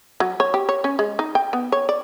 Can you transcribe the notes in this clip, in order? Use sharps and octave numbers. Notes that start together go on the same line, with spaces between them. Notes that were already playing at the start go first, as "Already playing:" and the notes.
F#3
C#5
G4
C#5
C#4
G#3
D#4
G5
B3
C#5
D5